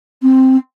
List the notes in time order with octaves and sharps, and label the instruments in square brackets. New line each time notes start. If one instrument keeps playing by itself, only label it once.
[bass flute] C4